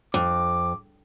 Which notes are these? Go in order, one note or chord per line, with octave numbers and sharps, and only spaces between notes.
F2 D6